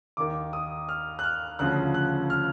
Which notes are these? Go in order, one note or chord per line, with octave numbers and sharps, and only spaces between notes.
D#2 D#3 D6
D#6
F6
F#6
F6
D2 C#3 F3 F#6
F#6
F6